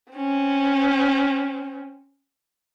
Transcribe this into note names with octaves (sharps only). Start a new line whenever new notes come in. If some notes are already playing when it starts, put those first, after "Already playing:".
C4 C#4